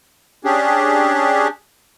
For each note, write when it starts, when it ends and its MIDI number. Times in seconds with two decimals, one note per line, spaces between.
0.45 1.48 61
0.45 1.48 62
0.45 1.48 67
0.45 1.48 68